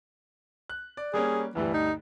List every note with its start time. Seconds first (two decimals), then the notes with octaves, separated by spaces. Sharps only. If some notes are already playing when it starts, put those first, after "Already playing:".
0.70 F#6
0.97 D5
1.14 G3 A#3 C#4 G#4
1.55 D2 G2 E3 G3
1.73 D#4